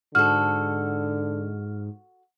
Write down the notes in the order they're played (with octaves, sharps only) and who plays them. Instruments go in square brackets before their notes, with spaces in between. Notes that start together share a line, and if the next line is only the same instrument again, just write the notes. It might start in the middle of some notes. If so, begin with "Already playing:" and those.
[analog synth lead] G#2 [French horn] D3 [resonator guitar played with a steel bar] F#4 A4 [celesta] F6